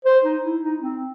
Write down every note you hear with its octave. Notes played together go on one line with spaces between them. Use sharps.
C5
D#4
E4
D#4
C4